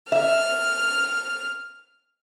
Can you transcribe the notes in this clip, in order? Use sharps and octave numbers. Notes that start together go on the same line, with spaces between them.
E5 F6